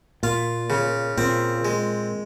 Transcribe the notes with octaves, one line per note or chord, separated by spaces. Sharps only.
A#2 F4
C#3
A#2 C4
G#3